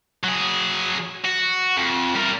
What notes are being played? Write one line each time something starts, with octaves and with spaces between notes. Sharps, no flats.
F#3 G#4
F#4
F2
G3 A#4